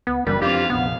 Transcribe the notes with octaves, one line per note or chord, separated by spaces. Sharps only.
C#2 B3 B4
F#1 E2 G2 G3 A#4 B4
F2 E3 C4 D4 F4 G4 F5
F1 A#1 B3 F5